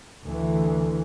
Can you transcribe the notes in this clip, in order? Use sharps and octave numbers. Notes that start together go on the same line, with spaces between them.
D2 E3